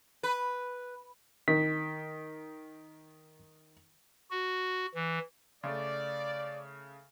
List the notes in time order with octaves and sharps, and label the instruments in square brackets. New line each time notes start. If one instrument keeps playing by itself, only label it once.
[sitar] B4
[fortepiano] D#3 [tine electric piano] B6
[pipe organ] F#4
E3
[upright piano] C#3 A3 [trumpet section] D5